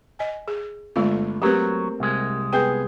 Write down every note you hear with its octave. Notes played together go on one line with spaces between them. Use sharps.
D#5 G#5
G#4
G1 G#3 A3 F4
F#3 A3 A#3 C4 G4 B4
C2 G#3
B3 G#4 G5 G6